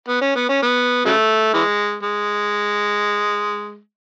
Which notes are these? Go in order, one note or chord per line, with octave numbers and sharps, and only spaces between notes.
B3
C#4
B3
C#4
B3
C#3 F#3 A3
E3 G#3
G#3